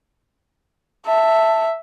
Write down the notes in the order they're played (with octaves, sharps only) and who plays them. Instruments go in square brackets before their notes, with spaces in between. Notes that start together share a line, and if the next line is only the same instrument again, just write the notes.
[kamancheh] E5 [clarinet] A5